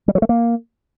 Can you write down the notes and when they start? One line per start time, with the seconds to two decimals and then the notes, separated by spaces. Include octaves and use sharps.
0.08 G3
0.15 F#3
0.22 A3
0.29 A#3